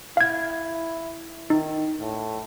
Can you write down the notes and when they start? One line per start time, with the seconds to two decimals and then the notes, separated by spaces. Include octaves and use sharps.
0.17 E4 F5 G#6
1.50 D#3 D#4
2.00 A2